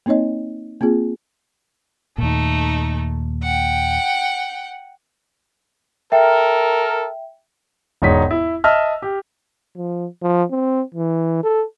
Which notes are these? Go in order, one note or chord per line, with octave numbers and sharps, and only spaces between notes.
A#3 C4 D#4 C#5 D#5
A#3 C4 F4 G#4
D#2 A#2 A3 D#4
F#5 G5
A4 A#4 E5 G5
E1 G#2 D#4 C#5 B6
E4
D#5 E5 A5 E6 F6
G4
F3
F3
C4
E3
A4